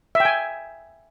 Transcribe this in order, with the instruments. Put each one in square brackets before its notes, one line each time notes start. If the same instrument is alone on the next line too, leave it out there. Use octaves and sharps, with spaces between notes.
[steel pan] E5
G5
G#5